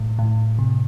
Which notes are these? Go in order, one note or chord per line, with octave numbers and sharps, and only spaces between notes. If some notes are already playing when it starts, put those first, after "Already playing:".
Already playing: A2
A2
C3